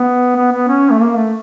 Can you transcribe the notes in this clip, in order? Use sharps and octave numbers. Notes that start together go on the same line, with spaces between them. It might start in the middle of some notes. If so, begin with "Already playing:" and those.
Already playing: B3
B3
B3
C#4
A3
A#3
A3